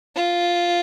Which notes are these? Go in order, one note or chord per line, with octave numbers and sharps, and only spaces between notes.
F4